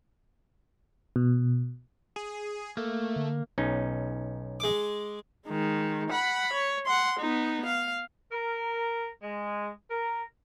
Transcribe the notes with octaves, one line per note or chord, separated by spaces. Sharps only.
B2
G#4
A3 A#3
D3
B1 C#4 D#4
G#3 D6
D#3 G#3
F#5 B5
C#5
F#5 C6
B3 D#4
F5
A#4
G#3
A#4